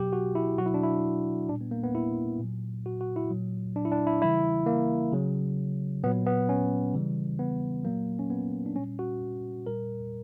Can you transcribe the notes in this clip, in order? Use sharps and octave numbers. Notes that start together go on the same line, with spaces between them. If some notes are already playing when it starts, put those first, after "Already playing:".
Already playing: B2 F#3 G4
F#4
E4
B2 F#3 F#4
E4
D4
E4
A#2 G3 D4
B3
A#3
B3
E4
A#2 F#3
F#4
F#4
E4
A#2 F#3
D4
E4
D4
E4
C#3 E3 G3 E4
A#3
C#3 F#3
A#2 F#3 B3
B3
C#4
C#3 E3 G3
B3
A#2 F#3 A#3
C#4
B3
D4
A#2 G3 C#4
F#4
A#2 G3 A#4